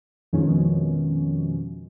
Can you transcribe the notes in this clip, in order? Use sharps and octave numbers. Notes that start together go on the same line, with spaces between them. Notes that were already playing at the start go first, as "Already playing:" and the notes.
F2 B2 D#3 F3 G#3 C#4